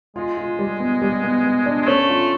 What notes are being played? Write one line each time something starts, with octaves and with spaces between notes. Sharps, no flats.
G#3 F4
F4
G3
B3
G3
B3
B3
D4
G#3
A3 C#4
F4